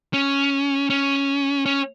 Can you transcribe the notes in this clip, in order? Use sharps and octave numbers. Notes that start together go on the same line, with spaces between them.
C#4
C#4
C#4